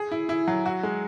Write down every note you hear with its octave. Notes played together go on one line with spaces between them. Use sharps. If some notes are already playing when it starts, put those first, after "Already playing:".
Already playing: G#4
E4
E4
F#3
F#4
G#3